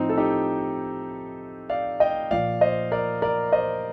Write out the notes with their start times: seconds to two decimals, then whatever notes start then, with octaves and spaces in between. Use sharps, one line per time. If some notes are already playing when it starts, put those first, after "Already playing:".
Already playing: A2 F3 C4 D#4
0.09 A4
0.18 D#4 G4
1.70 D5 F5
2.00 D#5 G5
2.31 A#2 F3 D5 F5
2.61 C5 D#5
2.92 A#4 D5
3.22 A#4 D5
3.52 C5 D#5